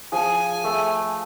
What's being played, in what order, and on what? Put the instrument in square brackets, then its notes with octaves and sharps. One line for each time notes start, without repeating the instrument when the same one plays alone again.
[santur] F3 G#4 [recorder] G#5
[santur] A3 A4